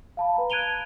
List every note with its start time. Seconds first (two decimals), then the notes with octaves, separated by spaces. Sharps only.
0.17 F5 A5 B5
0.36 B4 A#5
0.50 F#6 G#6 D7 D#7 F7 G7